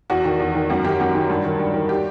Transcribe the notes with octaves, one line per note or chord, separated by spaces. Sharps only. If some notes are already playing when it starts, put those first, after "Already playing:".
E2 F#4
D#3
E2
D#3
F#2 F#4
D#3 G4
F#2 F#4
D#3
G2
D#3
G2
D#3
G4